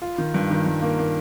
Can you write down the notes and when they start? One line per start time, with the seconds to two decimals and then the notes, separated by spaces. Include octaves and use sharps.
0.02 F4
0.18 D#3
0.34 G2
0.51 D#3
0.66 G2
0.82 A#3
0.99 A#3